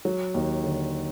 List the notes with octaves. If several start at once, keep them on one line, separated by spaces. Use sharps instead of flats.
F#3
D#2
D3